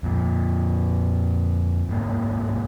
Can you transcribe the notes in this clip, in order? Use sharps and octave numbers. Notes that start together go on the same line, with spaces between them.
F2 A#2
G1 G#2 B2 A#3